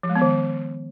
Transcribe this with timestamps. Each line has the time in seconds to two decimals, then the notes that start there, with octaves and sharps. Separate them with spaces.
0.03 F3
0.09 G#3
0.16 B3
0.22 D#3